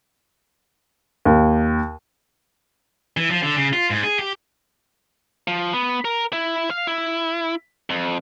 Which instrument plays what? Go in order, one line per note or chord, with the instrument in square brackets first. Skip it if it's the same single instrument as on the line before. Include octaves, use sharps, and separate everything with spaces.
[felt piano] D#2
[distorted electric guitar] E3
F3
D3
C#3
F4
G#2
G#4
G4
[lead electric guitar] F3
B3
A#4
E4
F5
E4
F2